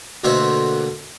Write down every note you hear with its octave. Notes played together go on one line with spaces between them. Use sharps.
D2 B2 A#3 F#4 C5 E5